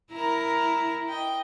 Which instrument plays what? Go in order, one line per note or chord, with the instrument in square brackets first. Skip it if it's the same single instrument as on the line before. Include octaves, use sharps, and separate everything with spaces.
[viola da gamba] E4 [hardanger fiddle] A#4 A#5
[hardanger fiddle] D#5 G5